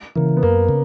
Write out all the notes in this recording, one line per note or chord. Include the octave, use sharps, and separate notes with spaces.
C#3 E3 A#3
B3
F#2 A#3
C#3